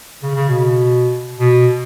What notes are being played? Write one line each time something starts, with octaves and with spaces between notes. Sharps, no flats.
C#3
C#3
B2
B2